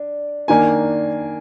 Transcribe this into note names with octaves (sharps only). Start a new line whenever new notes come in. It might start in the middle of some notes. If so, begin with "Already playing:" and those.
Already playing: D4
D#3 A#3 D4 G#5